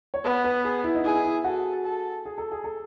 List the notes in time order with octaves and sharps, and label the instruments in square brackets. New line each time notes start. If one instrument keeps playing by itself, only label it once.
[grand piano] C#5
[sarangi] B3 [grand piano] B4
[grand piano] B4
G#4
E4
D#4
[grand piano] E4 [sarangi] G#4
[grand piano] E4
[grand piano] F#4 [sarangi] A4
[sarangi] A4
[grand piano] G#4
A4
G#4
A4